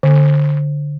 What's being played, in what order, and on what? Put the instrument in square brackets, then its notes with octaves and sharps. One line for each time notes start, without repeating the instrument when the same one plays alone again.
[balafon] D3